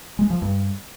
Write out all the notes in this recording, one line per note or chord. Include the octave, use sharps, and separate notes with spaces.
G#3
F3
G2